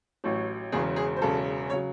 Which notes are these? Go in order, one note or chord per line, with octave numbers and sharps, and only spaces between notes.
A1 A2 F#3
E1 E2 C#3 F#3 G#4
G#4
C5
E1 E2 C#3 F#3 A4
C#3 F#3 C#5